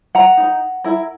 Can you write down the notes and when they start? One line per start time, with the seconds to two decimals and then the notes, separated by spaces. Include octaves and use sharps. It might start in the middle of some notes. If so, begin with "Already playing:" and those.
0.15 F#5 A#5
0.37 D#4 A#4
0.84 E4 A#4